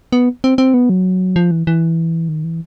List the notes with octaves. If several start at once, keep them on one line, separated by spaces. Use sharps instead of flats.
B3
C4
C4
B3
F#3
F3
E3
E3
D#3
E3